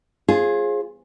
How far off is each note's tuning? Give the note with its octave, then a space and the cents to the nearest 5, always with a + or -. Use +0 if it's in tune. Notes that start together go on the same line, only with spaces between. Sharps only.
F4 -5 G#4 +0 C5 +35